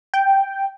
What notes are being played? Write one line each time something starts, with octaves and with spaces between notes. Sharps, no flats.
G5